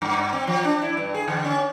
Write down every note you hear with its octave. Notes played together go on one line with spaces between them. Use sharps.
G2
C4
F3
D4
E4
G2
G#4
D3
C#4